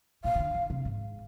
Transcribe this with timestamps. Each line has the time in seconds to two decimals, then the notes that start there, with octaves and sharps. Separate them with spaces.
0.24 A#2 F5
0.35 C3
0.39 D3
0.55 D#3
0.70 C3
0.85 G#2